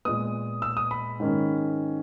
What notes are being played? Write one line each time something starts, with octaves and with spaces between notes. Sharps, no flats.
A#2 G#3 B3 D#6
E6
D#6
B5
G#2 D#3 A#3 C#4